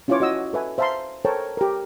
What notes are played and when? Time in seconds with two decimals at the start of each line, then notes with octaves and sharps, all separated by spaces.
0.08 C#4 E4 F4 B4 C#5 D6
0.20 F#4 D#5 E6
0.53 A4 B4 E5 G#5
0.78 C5 E5 F5 A5 A#5 C6
1.25 A4 A#4 C5 C#5 G5 A5
1.57 G4 A#4